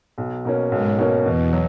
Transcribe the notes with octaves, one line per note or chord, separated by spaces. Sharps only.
B1
B2 A#3 C#4
B1 G#2
B2 A#3 C#4
E2 B2
F#3